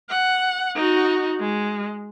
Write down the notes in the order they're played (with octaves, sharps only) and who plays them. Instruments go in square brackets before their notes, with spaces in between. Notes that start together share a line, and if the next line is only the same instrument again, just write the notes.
[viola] F#5
D#4 F#4
G#3